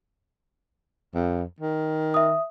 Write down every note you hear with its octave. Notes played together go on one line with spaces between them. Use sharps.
F2
D#3
E5 D#6